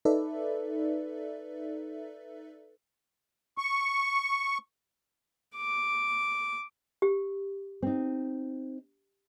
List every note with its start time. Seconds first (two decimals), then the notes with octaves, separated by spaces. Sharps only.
0.05 D#4 A4 B4 D5 E5
3.58 C#6
5.56 D6
7.02 G4
7.82 C4 D#4